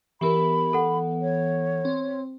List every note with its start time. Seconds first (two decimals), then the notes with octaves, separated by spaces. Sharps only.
0.21 E3 B3 G4 A#4 B5
0.73 A4 F#5
1.21 C#5
1.85 C4